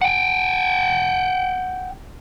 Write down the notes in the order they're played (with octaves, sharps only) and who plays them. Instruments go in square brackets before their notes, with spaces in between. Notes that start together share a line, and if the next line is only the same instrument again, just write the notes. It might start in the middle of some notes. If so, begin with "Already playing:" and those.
[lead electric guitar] F#5 G5